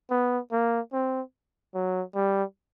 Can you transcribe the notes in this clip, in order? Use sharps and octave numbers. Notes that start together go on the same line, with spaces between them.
B3
A#3
C4
F#3
G3